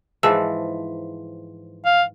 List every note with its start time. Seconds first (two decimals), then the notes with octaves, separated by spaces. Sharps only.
0.23 G#2 E3 F3 G#4 A5 E6
1.85 F5